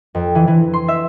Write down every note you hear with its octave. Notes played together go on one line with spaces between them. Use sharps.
F2
E3
E3
C6
E5